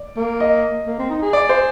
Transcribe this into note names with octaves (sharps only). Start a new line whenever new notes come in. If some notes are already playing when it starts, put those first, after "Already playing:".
Already playing: D5
A#3
D#5
A#3
C4
D#4
G#4
D5
C5